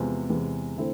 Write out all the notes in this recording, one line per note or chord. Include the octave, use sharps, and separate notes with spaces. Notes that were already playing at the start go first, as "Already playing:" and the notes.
Already playing: E2 C3 F3 G#3 B3
E2 C3 E3 G#3
D3 A3 C4 E4